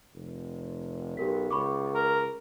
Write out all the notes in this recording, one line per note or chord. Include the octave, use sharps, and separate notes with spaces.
F1
B1 G4 A#4 B6
C#2 B5 C#6 D6
A#4